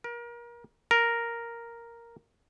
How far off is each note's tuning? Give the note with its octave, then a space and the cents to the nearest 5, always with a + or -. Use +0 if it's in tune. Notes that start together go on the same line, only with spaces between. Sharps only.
A#4 +30
A#4 +0